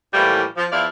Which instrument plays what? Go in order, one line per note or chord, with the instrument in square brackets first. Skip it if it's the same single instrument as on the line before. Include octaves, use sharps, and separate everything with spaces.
[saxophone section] A2 E3 F3 G3 A3 A#3
F3
E2 F3 E4 D5 F5